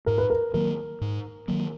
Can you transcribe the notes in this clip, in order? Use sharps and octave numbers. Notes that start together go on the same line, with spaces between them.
G#2 A#4
B4
A#4
D#3 F#3 A#3 A#4
G#2
D#3 F#3 A#3